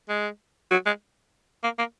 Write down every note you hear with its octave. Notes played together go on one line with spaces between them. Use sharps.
G#3
F#3
G#3
A#3
A#3